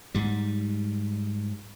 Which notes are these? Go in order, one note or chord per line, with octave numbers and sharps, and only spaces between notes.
G#2 G3